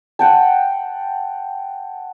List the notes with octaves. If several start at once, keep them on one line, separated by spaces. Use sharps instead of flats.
F#5 G5 A5